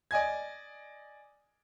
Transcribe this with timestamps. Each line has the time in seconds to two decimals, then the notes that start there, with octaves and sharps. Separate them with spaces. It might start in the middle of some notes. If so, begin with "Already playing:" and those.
0.11 D5 D#5 G#5 G#6